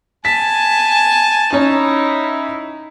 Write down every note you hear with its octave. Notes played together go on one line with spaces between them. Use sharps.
G#5 A5 B6
C#4 D#4 E4 C#5